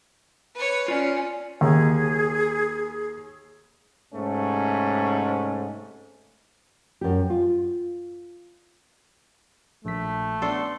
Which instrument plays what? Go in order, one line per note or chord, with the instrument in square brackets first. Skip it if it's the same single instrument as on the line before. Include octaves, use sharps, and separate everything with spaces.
[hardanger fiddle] B4 C#5
[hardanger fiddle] C#4 [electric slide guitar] F4 D5
[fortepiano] D#2 [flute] G#4
[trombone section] G#2 C3 A3 C#4
[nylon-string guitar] F#2 G4
F4
[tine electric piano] A#1 B6 [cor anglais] A3
[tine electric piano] B3 C6 [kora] D4 A4